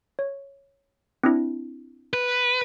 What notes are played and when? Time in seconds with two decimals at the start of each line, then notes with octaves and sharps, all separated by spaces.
0.19 C#5
1.24 C4 D4 E4
2.13 B4